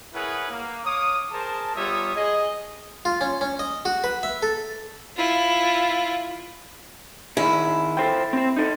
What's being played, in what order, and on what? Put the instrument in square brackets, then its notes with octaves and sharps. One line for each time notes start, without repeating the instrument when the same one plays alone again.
[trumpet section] E4 G#4 A#4 B4 C#5 F#5
A#3
C#5 F5 D6 D#6
G#4 A#4 C5 A5
G3 B3 F4 C#5 E5 D#6
G#4 D#5
[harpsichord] F4
C#4
C#4
D#5
F#4
B4
E5
A4
[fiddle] E4 F4
[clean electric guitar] D#3 G#4 [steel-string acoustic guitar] E4
[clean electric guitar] A4 C5 G5
C4 C5
D#4 A4